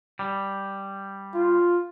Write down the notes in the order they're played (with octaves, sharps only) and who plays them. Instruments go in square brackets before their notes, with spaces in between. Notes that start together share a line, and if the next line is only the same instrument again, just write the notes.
[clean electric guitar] G3
[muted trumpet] F4